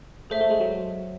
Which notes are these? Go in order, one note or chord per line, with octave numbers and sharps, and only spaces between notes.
A3 G#4 C5 E5
A3
G#3
F#3